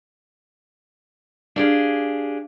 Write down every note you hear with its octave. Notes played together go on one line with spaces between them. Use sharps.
D4 G4 G#4 F5